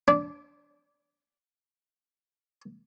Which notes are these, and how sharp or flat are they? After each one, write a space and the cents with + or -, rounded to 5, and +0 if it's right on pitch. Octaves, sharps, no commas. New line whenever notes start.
D4 -15